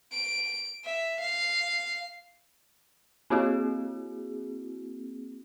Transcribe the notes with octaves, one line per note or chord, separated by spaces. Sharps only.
D7
E5
F5
A#3 C4 E4 F#4 G#4